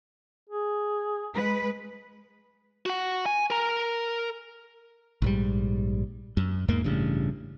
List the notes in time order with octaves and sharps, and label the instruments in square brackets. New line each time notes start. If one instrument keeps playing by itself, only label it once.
[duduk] G#4
[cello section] G#3 B4
[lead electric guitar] F#4 F#5
G#5
A#4 A#5
[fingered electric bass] A#1 G#2 G3
F#2
E2 G#2 A#3
A1 G2 C#3